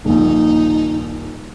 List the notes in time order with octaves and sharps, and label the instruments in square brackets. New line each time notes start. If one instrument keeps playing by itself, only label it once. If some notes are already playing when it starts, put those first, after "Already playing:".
[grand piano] D#1 A#1 [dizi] D#4